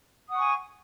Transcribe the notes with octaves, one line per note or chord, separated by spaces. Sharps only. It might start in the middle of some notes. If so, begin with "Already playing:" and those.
F#5 G#5 C#6 D#6